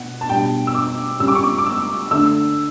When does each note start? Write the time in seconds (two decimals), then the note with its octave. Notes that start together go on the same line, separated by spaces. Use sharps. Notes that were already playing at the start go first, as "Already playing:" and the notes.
Already playing: B2 F#5
0.21 A5
0.29 B2 G3 D4 G5
0.67 E6
0.75 D6
1.20 C#3 G3 C#4 E6
1.28 D6
1.35 C#6
1.43 D6
1.58 D6
1.66 E6
2.11 D3 A3 D4 E6